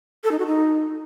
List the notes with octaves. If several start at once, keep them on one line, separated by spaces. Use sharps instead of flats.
A4
D#4
F#4
D#4